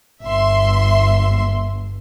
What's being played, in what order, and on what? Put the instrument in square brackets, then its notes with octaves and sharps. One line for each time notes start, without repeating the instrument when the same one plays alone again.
[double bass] G1 [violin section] E5 C6